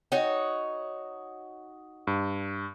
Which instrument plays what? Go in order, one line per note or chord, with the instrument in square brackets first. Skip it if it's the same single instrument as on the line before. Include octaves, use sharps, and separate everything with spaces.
[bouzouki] D#4 F#4 C#5
[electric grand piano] G2